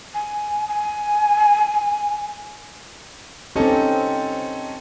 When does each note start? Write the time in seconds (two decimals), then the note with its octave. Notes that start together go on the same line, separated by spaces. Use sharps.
0.14 G#5
0.68 G#5
3.56 C4 C#4 D#4 G4 A4